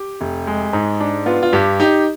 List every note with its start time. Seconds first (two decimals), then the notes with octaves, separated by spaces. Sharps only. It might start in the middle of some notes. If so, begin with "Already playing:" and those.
Already playing: G4
0.21 F1
0.47 G#3
0.73 G#2
1.00 D4
1.26 B3 F4
1.43 F4
1.53 G2 G4
1.80 D#4 G4